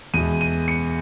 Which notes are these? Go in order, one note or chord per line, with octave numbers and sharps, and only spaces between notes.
E2 B2 G#3 D#7
D#7
C#7